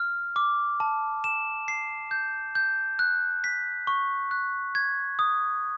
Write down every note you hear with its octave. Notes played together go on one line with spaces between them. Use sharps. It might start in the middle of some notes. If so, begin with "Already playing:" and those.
Already playing: F6
D6
A5
E7
C7
G6
G6
F#6
B6
C#6
F#6
G#6
D#6